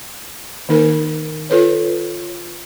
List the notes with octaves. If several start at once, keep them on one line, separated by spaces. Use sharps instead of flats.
D#3 A#3 D#4 A#4 G#5
F4 A4 B4 C#5